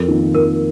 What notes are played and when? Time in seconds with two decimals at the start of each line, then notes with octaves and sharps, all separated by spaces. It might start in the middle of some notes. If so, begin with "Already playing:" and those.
Already playing: F2 A#4
0.08 D#3 A#3 F4
0.34 F2 A#4